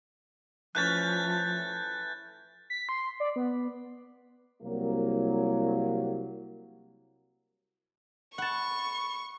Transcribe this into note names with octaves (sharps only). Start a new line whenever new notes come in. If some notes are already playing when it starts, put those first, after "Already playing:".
E3 F3 A3 C#4 F#6 G6 A6
B6
C6
D5
B3
C2 F#3 A#3
F#5 A5 B5 C#6